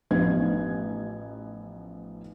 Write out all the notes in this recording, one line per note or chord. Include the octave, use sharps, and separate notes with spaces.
A1 F3 B3 D#4 G#6